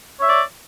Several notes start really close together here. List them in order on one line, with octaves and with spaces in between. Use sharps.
C#5 E5 D5